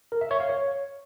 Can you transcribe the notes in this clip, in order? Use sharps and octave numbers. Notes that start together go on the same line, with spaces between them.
A#4
E5
C#5
F5
C#5